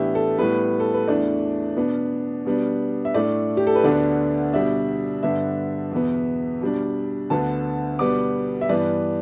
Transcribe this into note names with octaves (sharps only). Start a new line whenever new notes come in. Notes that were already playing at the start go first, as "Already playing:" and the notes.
Already playing: A2 E3 B3 D4 E4 G4
A4
A2 G3 B3 B4
A4
B4
E2 E3 A3 D4 D5
B2 B3 D4
B2 G3 B3 D4
E5
A2 A3 D4 D5
G4
A4
B4
D2 D3 B3 D4 D5
B2 G3 D4 E5
G2 D3 B3 D4 E5
E2 B2 B3
B2 G3 D4
D2 D3 B3 A5
B2 G3 B3 D4 D6
E5
G2 E3 B3 D5